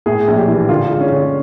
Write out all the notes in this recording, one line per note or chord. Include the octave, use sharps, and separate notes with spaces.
A2 G#4
A#1
G4
E3
D3 F4
G#3
C#4
D3